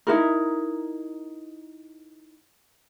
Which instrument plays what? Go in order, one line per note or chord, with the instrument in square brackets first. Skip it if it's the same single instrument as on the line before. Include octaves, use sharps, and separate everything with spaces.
[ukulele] D#4 E4 F#4 A#4